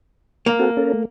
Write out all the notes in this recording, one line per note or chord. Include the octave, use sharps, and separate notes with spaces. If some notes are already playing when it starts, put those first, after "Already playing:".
A#3
C4 F#4 A4
C#4 A4 A#4
A3